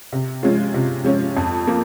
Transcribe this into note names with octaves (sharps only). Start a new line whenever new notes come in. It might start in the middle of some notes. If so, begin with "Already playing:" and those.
C3
F3 G#3 C#4 F4
C3
F3 G#3 C#4 F4
F2
F3 A#3